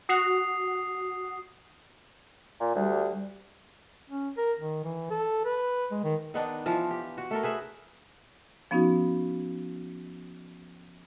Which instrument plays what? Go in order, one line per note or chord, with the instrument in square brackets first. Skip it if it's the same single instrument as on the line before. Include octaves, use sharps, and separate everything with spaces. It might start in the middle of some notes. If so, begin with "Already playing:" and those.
[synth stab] F#4 [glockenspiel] D#6 C7 F7
[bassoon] A#2
[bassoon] D2 [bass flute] G3
[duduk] C#4
A#4
D#3
E3
A4
B4
G#3
D#3
[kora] D#3 B3 D4 D#4
E3 F3 F4
G4
F#4
A3 A4 A#4
G#4 B4 E5
[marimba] F3 B3 C#4 D#4 F#4